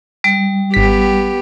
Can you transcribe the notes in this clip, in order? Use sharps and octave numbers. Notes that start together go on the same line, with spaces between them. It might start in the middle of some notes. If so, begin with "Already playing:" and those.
G3 D7
G#1 B3 G4 B6